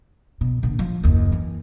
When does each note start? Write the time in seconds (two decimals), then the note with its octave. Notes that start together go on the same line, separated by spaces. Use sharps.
0.41 B2
0.63 A#1 D3
0.79 F3
1.03 F#1 D#2
1.32 E3